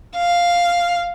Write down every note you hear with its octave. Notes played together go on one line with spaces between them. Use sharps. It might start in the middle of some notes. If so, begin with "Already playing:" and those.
F5